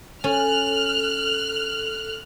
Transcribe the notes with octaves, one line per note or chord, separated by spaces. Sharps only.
C#4 A4 F6 F#6